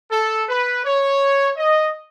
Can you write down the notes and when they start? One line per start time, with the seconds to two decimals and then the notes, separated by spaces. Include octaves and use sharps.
0.11 A4
0.47 B4
0.84 C#5
1.56 D#5